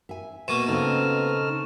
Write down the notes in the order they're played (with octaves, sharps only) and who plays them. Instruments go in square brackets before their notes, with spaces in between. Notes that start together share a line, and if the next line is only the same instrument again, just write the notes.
[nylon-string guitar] E5 G#5
[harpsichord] B2 A#3 [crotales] C#6 D#7 E7
[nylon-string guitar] C#3 C4 [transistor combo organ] D#4 A4 F6